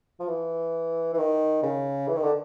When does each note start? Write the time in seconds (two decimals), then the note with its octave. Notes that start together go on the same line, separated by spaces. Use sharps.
0.20 F3
0.28 E3
1.13 E3
1.18 D#3
1.63 C#3
2.08 E3
2.16 D#3
2.23 D3